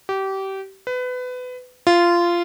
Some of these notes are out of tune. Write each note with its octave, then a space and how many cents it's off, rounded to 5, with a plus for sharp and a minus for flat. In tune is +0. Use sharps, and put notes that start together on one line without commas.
G4 -25
B4 +25
F4 -15